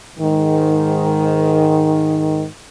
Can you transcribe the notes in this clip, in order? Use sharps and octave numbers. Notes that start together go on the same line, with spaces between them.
G#2 D#3